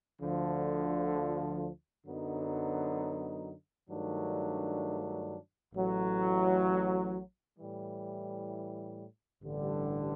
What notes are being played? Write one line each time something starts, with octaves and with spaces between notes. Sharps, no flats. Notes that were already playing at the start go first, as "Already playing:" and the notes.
D2 D3 F3
F#2 D3 F#3 B3 D#4
G2 D#3 F#3 A3 D4
A1 A2 F#3
A2 E3 G3
A1 G2 D3 G3